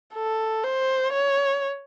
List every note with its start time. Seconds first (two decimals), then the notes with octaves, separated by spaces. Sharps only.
0.14 A4
0.64 C5
1.13 C#5